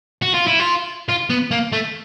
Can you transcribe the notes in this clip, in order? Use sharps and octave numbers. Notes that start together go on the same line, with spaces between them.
F#4
F4
E4
F4
F4
B3
A#3
A3